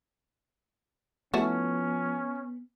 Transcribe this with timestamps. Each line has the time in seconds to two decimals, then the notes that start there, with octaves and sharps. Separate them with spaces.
1.34 F3 A3 B3 C#4 E4 F#4